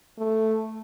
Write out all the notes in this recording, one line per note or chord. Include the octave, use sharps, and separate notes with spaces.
A3